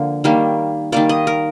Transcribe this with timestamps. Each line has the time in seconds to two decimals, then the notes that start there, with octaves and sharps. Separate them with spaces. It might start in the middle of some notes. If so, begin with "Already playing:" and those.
Already playing: D3 F3 A#3
0.24 D#3 G3 A#3
0.92 D#3 G3 A#3 D5
1.09 D#5
1.27 A#4